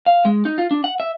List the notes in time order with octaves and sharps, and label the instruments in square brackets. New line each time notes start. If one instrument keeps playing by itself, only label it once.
[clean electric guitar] F5
G#3
D#4
F4
D4
F#5
E5